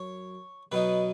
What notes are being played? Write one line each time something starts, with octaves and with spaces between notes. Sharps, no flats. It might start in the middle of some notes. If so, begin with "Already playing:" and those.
Already playing: F#2 C#5
B2 F#3 B3 D#4 B4